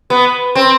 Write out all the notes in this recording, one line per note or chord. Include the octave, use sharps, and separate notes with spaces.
B3
C4